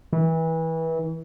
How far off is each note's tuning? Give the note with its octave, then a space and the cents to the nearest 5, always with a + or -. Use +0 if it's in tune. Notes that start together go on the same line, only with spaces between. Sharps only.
E3 -25